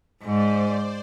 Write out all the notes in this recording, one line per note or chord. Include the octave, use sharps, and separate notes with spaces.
G#2 C5 D5